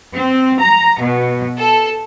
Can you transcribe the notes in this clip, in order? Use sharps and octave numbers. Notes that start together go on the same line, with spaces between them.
C4
A#5
B2
A4